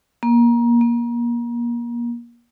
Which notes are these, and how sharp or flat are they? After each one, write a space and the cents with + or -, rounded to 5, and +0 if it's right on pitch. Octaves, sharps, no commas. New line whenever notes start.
A#3 +25
A#3 +30